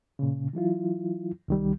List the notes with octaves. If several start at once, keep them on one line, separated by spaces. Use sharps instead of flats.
A#2 C#3
E3 F#3 E4 F4
C2 D#3 G3